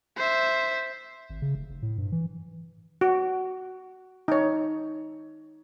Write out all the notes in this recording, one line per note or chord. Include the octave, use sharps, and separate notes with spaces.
C5 E5
G#1
C#3
F1
F1
A2
G2
E3
F#4
D#4 C#5